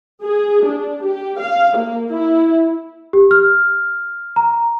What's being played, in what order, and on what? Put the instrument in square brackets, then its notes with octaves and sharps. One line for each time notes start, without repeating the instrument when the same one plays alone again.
[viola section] G#4
D4
G4
F5
A#3
E4
[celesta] G4
F6
A#5